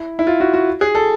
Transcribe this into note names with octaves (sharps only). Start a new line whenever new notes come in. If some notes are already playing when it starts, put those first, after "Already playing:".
Already playing: E4
E4
F4
F#4
F#4
G#4
A4